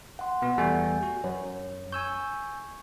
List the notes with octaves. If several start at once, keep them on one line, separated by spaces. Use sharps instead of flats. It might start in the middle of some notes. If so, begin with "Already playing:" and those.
F#5 C6
B2 B3 F#5
E2 G3 A3 G#5 G6
F#4
F#2 C#5
G#5 C#6 E6 G6